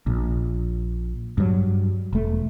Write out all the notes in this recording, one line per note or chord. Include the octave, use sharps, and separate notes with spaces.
A#1
G2 F#3
E1 A3